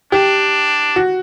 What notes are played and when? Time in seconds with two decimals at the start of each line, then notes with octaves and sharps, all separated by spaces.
0.12 D4 G4
0.96 F#4